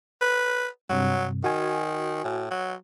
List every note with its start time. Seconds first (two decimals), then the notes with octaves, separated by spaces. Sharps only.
0.21 B4
0.90 G2 C3 F#3
1.44 D#3 F#4 G#5
2.24 A2
2.50 F#3